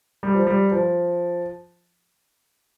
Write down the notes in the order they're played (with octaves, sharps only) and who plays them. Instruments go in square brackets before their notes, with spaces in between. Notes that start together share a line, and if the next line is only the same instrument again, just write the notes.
[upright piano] G3
F3
G3
F3